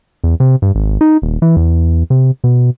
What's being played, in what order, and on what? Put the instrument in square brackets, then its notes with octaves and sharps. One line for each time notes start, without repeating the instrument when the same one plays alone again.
[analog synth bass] E2
C3
G2
G#1
D#4
D#1
E3
E2
C3
B2